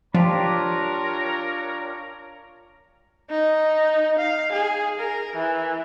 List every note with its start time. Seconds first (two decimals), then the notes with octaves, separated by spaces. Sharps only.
0.15 F3 D4 F4 G4 A#4 C#5 A#5
3.31 D#4
4.19 F5
4.52 G#4
5.00 A#4
5.36 E3